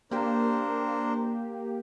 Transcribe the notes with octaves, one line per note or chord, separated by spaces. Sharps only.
A#3 D4 G4 A#4 C5